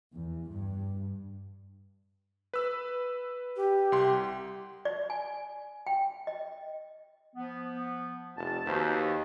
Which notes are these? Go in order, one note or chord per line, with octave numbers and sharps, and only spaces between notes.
E2
G2
B4 E6
G4
C2 C6
D5
G#5
G5
D#5
F3 B3
F1 A5
D#2 F#4 B4 C5